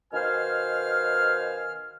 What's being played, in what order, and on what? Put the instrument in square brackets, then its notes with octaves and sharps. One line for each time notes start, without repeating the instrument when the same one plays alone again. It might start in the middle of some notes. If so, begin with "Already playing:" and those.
[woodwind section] B2 D#3 C5 F5 G#5 F6